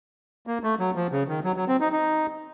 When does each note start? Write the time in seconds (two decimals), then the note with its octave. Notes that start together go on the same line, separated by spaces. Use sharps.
0.47 A#3
0.63 A3
0.79 F#3
0.96 F3
1.12 C#3
1.28 D#3
1.44 F#3
1.56 F#3
1.68 C4
1.80 D#4
1.92 D#4